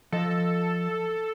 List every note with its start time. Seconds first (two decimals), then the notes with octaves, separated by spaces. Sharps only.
0.12 F3 A4 D#5